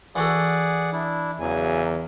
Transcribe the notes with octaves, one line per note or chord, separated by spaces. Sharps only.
E3 F#4 G#4 A4 D5 F#5
D4 E4
E2 C#3 F#3 G#5